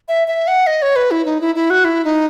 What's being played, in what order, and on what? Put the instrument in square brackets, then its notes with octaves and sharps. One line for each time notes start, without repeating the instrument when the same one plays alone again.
[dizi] E5
E5
F#5
D#5
C#5
B4
E4
D#4
E4
E4
F#4
E4
D#4